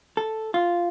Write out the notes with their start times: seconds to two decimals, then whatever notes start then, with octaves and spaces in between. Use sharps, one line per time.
0.17 A4
0.54 F4